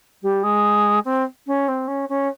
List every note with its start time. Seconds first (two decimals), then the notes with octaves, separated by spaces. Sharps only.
0.22 G3
0.43 G#3
1.04 C4
1.46 C#4
1.68 C4
1.87 C#4
2.09 C#4